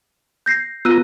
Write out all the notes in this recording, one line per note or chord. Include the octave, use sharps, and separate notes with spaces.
G6 A#6 C7
B3 F4 A#5 E6 F#6 D#7